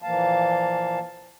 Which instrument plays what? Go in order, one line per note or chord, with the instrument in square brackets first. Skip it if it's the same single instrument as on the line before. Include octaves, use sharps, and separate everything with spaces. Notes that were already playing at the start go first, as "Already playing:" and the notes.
[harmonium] A#2 E3 F3 A#3 F5 A5